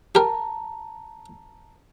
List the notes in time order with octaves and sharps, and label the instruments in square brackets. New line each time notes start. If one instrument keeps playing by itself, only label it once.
[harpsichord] G4 A#4 [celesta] A5 A#5